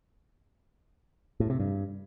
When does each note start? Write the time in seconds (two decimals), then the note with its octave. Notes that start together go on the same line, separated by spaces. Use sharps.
1.40 A2
1.50 C3
1.59 G2